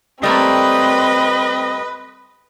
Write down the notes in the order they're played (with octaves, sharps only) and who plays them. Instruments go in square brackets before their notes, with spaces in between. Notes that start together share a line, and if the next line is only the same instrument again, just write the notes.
[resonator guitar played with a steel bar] G3 A3 A#3 [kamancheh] C4 [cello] B4 [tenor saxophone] D#5